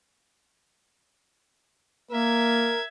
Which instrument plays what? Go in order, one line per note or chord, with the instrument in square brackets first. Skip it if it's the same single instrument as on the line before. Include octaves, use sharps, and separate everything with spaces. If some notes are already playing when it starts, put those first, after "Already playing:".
[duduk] A#3 [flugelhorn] A#4 [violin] E5 G#6